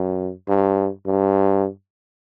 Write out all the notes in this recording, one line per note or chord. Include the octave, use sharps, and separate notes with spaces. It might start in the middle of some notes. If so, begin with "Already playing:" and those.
Already playing: F#2
G2
G2